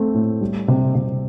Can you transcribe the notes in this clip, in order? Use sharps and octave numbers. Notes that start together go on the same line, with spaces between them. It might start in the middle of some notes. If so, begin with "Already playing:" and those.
Already playing: A3 C4
A2
G3
C3
C3